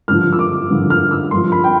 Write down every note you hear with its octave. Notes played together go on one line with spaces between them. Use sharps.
G2 D3 F3 F6
E6
D6
G2 D3 F3
F6
E6
G2 F3 C6
B5
G5